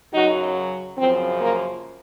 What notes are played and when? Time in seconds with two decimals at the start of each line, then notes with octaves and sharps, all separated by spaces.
0.13 F#2 C#3 F#3 D#4 F#4
0.98 F#2 C#3 F3 C4
1.41 A#3